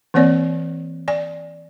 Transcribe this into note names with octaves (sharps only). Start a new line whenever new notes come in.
E3 A#3 C4 C#5 D5
D5 G#5